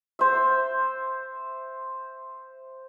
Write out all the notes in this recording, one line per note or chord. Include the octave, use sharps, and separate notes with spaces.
C5 E5